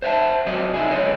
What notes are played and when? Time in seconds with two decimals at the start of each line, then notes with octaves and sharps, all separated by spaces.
0.02 C5 E5 F5 A5
0.46 C3 F#3 D5 D#5
0.74 D#4 E4 G#4
0.91 C#2 D3 G#4 C#5 D#5